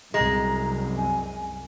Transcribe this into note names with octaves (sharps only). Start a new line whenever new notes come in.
C2 F#2 G#3 A#5
G#5